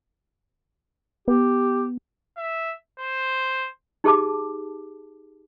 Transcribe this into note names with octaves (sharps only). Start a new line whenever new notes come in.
B3 G4
E5
C5
D#4 G4 G#4 A5 D6